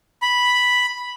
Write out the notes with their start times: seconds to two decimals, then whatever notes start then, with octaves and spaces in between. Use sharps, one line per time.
0.22 B5